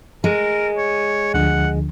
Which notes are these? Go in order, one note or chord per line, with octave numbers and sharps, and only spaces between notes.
G#3 A#4
C#5
D2 D3 F3 F#5